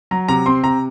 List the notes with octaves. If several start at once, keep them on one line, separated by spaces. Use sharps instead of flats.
F#3 A#5
C3 A#5
C4 C6
C3 A#5